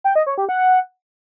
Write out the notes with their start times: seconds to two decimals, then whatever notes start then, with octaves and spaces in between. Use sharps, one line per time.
0.04 G5
0.15 D#5
0.27 C#5
0.38 G4
0.49 F#5